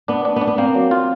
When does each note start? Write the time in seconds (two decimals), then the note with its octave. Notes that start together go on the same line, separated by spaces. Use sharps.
0.08 B3 D4
0.25 D4
0.36 B3
0.41 D4
0.47 B3
0.58 A#3 C4
0.75 F#3
0.91 F4